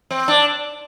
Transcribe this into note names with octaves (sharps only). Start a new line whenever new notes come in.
C4
D4